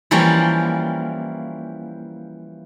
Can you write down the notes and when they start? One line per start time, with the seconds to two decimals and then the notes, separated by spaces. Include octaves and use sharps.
0.11 E3 F3 G3 A#3 C#4